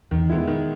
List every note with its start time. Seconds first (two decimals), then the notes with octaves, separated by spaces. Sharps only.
0.11 E2 D#3
0.30 G#3 B3 E4
0.47 D#3